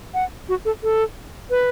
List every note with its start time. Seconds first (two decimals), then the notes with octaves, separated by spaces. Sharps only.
0.14 F#5
0.49 F#4
0.65 A4
0.83 A4
1.50 B4